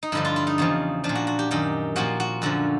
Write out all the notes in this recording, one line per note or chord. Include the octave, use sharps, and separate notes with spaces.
D#4
G2 D3 F3 E4
F4
E4
D#4
E2 C#3 F3
F3 D4
A#2
F#4
F#4
G4
F#2 D#3 G4
A#2 F3 F#4
F#4
F#2 D3 F3 F#4